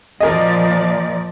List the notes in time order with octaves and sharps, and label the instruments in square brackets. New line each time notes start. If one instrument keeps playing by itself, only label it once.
[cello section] A#2 F3 D5 [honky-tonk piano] A#4 D#5